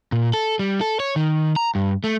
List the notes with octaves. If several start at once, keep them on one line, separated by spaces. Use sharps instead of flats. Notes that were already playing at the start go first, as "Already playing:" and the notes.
A#2
A4
G3
A4
C#5
D#3
A#5
G2
A3